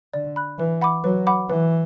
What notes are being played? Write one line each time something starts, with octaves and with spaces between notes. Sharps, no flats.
D3 D5
B5 F#6
E3 B4
F#5 B5 D6
F#3 B4
F#5 B5 D6
E3 B4